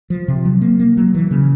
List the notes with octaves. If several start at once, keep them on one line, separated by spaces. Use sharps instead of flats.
F3
C3
F#3
A#3
A#3
F#3
E3
C#3